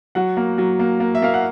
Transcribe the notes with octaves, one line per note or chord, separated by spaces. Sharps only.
F#3 F#5
A#3
F#3
A#3
A#3
E5
A#3 F5
F#5